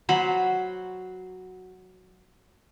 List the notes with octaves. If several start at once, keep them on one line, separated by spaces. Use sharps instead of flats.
F#3 F#4 C5 B5